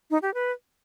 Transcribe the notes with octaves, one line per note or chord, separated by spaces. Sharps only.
D#4
G4
B4